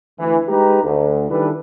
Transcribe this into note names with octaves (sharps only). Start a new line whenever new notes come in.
D2 E3
G#3 D#4 G4 B4 A#5
D2
D#3 E3 G3 D4 A4 B4